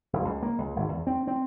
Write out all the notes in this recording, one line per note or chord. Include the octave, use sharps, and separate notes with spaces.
F#1
C#2
A#3
C#2
G#1
E2
C4
C4